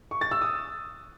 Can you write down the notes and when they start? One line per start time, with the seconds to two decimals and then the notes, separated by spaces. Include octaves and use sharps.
0.11 C#6
0.21 A6
0.31 E6
0.42 D#6